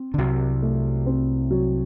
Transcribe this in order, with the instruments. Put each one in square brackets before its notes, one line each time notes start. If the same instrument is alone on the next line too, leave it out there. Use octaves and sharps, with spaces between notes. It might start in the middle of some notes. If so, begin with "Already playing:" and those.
Already playing: [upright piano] C4
[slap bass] D3
[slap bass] C2 C3 [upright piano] F#3
[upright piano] A3
C4
F#3